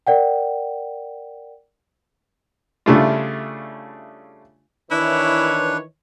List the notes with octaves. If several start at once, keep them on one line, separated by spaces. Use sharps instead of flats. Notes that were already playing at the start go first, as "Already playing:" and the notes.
A#4 D5 F#5 G5
C#3 G3 A3 D4 E4 F4
D#3 E3 D4 E4 B4 C#5